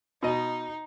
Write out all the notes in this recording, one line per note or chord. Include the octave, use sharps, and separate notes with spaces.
B2 D#4 D#5